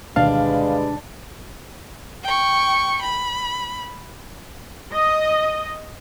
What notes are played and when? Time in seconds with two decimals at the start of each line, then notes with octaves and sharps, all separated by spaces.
0.16 D2 B2 D#3 G3 G#3 D4 B4 F5
2.23 G5 C#6
3.02 B5
4.93 D#5